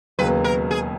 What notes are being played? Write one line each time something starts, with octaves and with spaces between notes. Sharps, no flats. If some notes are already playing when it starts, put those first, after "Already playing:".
E1 D#2 C#3 F#3 A#3 B4
A#4
G#4